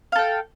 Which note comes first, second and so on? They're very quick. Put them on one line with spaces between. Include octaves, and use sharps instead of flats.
F5 A4 G5